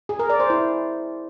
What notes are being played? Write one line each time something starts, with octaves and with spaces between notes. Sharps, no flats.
G#4
A#4
D5
C5
E4